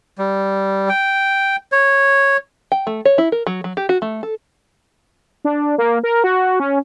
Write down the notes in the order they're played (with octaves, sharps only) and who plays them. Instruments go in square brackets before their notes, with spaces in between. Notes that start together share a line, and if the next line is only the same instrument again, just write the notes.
[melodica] G3
G5
C#5
[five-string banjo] G5
A3
C#5
E4
A#4
F#3
F#3
G4
F#4
A3
A4
[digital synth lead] D4
A#3
A#4
F#4
C#4